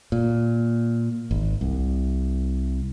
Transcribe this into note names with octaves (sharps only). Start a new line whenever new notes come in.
A#2
G#1
C2